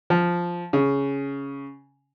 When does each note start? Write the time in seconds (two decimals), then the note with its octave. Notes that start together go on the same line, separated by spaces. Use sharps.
0.10 F3
0.73 C#3